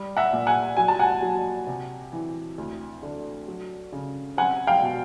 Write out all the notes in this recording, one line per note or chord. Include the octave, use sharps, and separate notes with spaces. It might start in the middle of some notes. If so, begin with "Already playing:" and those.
Already playing: G3
E5 F#5
A#2
F#5 G#5
F#3 G#5
A5
F#5 G#5
F#3
C3
E3
D2
D3
F#3
C#3
C4 F#5 G#5
F5 G5
B2